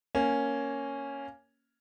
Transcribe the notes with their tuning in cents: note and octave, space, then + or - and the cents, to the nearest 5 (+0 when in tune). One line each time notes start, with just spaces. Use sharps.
A#3 +0 C#4 +0